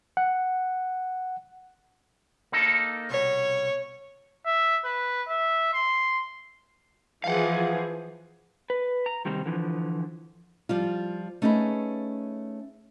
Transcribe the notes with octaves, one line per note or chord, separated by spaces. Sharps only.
F#5
A#3 D#4 A4
C2 B2 C#5
E5
B4
E5
C6
E3 F3 G#4 F5 F#5
B4
A#5
C3 D#3 G3 C4 D#4
D3 E3 F3
F3 G3 F4
A3 C#4 D#4 F#4 G#4 B4